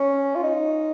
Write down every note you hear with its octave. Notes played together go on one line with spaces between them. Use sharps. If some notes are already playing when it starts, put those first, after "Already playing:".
Already playing: C#4
F4
D#4